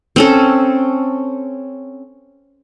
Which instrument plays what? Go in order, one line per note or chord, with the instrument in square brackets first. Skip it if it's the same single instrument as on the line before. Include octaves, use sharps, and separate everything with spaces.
[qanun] C4 C#4 A4